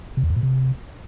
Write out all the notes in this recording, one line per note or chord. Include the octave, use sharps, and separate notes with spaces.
C3
E2
F2
A#2
C3